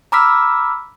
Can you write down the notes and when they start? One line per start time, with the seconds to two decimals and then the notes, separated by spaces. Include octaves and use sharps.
0.12 A#5 B5 D6 E6 F6 B6